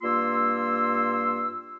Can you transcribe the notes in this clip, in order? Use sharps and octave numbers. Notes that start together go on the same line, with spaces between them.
G2 A#3 F4 C6 E6